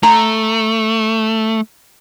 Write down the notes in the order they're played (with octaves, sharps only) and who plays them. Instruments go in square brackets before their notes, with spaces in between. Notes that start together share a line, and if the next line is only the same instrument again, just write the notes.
[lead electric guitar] A3 [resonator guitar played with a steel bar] A#5